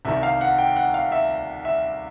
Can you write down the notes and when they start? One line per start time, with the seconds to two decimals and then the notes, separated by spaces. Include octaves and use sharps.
0.05 C2 C3 D#3 E5
0.23 F5
0.41 F#5
0.58 G5
0.76 F#5
0.94 F5
1.12 E5
1.65 E5